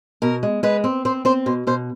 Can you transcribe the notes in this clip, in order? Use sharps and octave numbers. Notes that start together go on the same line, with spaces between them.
B2 A#4
G#3
G#3 B4
C4
C4 C5
C4 C5
B2 C5
B2 C5